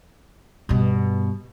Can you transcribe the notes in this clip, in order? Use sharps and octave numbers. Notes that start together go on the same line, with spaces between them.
G2 B2